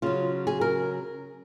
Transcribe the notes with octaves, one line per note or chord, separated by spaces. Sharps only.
C#3 F#3 F4
G#4
A#4